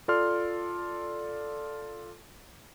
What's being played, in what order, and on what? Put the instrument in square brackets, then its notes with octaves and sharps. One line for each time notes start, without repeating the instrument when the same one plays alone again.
[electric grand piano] F4 A4 D5 C6 F6